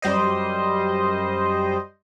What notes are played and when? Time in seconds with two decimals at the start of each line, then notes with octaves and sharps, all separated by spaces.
0.02 F#2 G3 C5 D#5